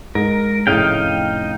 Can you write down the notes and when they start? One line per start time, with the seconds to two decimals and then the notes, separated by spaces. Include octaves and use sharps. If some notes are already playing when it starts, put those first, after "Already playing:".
0.15 G#2 A#4
0.67 F1 A2 C#3 D#4 F5 G5